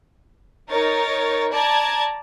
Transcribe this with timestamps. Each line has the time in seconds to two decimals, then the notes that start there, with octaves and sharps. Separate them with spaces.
0.69 D#4 A#4 C#5 A6
1.51 D5 A5 A#5 G#6